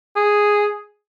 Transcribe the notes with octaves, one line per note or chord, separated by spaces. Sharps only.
G#4